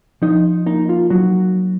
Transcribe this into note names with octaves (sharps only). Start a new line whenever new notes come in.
F3 D#4
A#3 D#4
F4
F#3 D#4 F#4